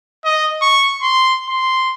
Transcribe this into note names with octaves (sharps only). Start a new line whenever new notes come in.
D#5
C#6
C6
C6